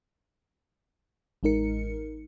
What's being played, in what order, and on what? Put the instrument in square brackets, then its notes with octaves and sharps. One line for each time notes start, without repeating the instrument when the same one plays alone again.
[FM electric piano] A1 G#3 D#4 A#4 C#7